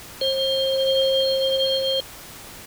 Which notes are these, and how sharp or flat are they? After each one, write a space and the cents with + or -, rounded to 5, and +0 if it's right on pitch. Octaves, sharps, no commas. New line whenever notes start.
C5 +35